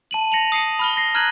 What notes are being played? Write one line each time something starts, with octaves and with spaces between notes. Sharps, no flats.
A5 D#7 F#7
A#6 C#7 D#7 F7 F#7
D#6 C7 C#7 D#7
B5 F6 G7
A#6 C7
A#5 F6 F#6 G#6 D#7 F#7